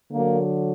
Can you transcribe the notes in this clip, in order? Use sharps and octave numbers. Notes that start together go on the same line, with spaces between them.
D3 F#3 A#3